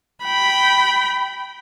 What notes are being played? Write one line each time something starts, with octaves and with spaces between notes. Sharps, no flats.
G5 B5